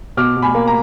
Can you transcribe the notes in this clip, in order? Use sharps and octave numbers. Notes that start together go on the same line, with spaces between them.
B2 D6 F6
B2
G#5 B5
A#3
A#5